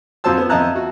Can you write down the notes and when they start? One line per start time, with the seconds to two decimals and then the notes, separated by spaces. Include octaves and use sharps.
0.24 F2 F3 F#3 C5 A5 E6
0.38 B3
0.49 F2 D#5 E5 A5 A#5 F#6
0.75 F#4